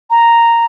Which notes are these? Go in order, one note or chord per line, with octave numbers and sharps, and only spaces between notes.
A#5